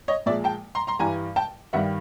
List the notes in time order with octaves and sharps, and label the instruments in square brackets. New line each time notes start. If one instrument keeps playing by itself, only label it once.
[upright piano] C#5 D#5
A#2 F3 G#3 D5 E5
G5 A5
A#5 C6
A#5 C6
G2 E3 G3 G#5 A#5
G5 A5
G2 D#3 G3 E5 F#5